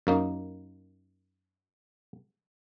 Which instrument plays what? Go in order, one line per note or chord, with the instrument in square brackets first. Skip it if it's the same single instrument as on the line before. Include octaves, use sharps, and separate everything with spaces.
[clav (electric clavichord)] F#2 A#3 D#4